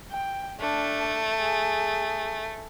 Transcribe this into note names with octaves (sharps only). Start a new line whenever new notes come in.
G5
A3 D4
G#4